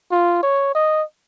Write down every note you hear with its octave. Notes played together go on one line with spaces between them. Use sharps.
F4
C#5
D#5